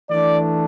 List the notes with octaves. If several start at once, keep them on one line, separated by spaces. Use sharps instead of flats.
E3 A3 D4 D5